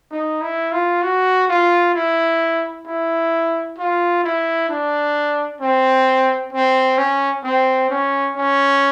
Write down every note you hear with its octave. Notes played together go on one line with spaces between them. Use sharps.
D#4
E4
F4
F#4
F4
E4
E4
F4
E4
D4
C4
C4
C#4
C4
C#4
C#4